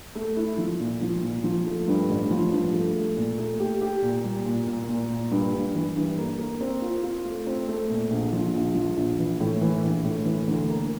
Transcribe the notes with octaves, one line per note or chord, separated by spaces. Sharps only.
A3
E4
F3
A#2
F3
A#2
F3
A3
G2
A1
F3
G2
A3
A3
A#2
A3
G4
G4
A#2
G3
A#2
A#2
A#2
A#2
G2
G2
E3
G2
A#3
A#3
C4
F4
F4
A3
C4
A3
A#2
A#1
F3
A#1
F3
A#1
E3
A2
E3
A#1
A2
E3
D2
A#3